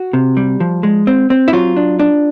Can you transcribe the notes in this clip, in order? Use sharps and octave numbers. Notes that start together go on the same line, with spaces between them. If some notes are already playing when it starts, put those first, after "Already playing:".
Already playing: F#4
C3
G3
F3
G#3
C4
C4
E4
F#3 F4
D4
D4